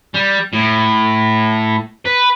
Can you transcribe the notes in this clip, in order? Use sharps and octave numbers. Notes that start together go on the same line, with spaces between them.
G3
A2
B4